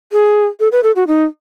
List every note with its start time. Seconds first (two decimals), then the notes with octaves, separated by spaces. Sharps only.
0.12 G#4
0.60 A4
0.72 B4
0.83 A4
0.96 F#4
1.07 D#4